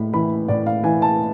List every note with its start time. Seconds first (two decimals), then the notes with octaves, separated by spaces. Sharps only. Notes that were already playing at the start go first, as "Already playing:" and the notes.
Already playing: A2 B5
0.13 E3 B5
0.48 A2 D5
0.67 F5
0.84 E3 G#5
1.02 A5